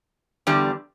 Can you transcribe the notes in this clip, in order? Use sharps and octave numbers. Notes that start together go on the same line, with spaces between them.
E2 D3 G3